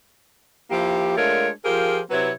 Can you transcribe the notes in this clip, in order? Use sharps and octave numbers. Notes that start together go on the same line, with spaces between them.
F3 A#3 E4 G4
G#3 A3 D4 F4 A#4 C#5
F3 F4 G4 G#4 A#4 C5
C3 F#3 C4 E4 B4 C#5